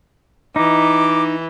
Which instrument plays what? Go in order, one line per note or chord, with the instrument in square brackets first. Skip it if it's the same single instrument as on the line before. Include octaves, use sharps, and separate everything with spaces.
[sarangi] E3 [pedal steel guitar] D#4 [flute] D6